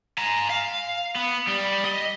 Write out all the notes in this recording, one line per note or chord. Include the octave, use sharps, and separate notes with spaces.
G#5 A#5
F5
B3
G3
D#5